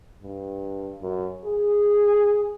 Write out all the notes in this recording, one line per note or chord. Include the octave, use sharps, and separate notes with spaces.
G2
F#2
G#4